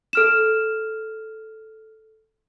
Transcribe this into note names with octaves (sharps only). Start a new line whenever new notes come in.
A4 F6 E7